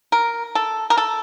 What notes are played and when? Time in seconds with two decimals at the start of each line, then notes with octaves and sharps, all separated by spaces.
0.12 A#4
0.55 A4
0.90 A#4
0.98 A4